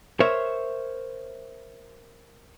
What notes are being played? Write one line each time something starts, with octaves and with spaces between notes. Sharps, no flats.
A#4 C5 C#5 E5